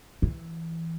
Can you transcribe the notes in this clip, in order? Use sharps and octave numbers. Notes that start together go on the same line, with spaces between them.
E3